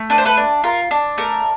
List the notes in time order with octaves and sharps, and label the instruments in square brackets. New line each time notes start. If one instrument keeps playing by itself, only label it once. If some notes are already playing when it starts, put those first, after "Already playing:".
Already playing: [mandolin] A3
D4 B4
C5
A4 B4
D4
F4 A#4
D4
A3 A#4